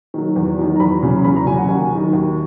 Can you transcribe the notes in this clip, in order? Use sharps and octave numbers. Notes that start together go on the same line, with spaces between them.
D#3 F#3
E2
D#3 F#3
A#5
E2 B5
C#3 F#3
E2 B5
A#5
C#3 F#3 G#5
F#5
D#2 G#5
D#3 F#3
D#2